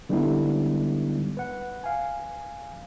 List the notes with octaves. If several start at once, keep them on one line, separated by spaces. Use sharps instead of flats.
D3 G3 G#3 B3 D#4 E4
B4 F#5
F5 G#5